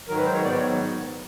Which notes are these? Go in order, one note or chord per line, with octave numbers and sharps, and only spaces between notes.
G#2 D#3 F#3 A#4
B4
C5
C#5
G#2 D#3 F#3 B3 D5
C#5